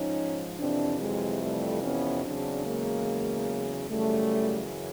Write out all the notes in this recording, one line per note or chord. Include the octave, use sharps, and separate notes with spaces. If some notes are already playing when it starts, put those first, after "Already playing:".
Already playing: G#2 F3 C#4 D#4
F2 C3 E3 C4 D4
F#3 G#3
G3 A3
B3 C#4
E2 C#3 F#3 C4 D4
G#3 A#3
F#2 C#3 E3 G3 A3